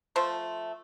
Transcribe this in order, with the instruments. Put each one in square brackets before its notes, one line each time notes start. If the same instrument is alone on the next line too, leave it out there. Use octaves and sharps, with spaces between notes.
[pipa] F3 A3 C5